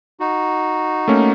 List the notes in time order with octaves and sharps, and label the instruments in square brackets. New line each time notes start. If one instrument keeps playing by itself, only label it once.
[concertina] D#4 F#4
[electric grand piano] A3 A#3 C#4